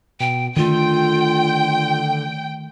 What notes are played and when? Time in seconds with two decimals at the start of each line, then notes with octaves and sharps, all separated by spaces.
0.20 B2 G5
0.56 D3 D#3 A3 F4 G5